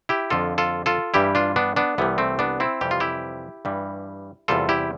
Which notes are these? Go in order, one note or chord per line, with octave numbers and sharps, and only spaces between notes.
E4 G4
F2 D3 F3 F4 A4
F4 A4
F4 A4
G2 E3 G3 E4 G4
D4 F4
B3 D4
B3 D4
C2 C3 E3 G3 B3
A3 C4
B3 D4
C4 E4
F2 C3 E3 G3 G4
F4
E4 G4
G2 E3 G3
E2 C3 G3 F4 A4
E4 G4